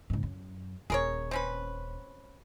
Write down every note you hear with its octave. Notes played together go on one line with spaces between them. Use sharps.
F#1 G#2
F#2
D#1 G#4 A#4 C#5
C4 C#4 B4